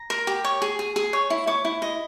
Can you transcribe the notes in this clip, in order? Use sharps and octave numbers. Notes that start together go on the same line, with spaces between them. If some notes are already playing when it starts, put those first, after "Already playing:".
Already playing: A#5
A#4
G4
C#5
G#4
G#4
G#4
C#5
E4
C#5 D6
E4
D#5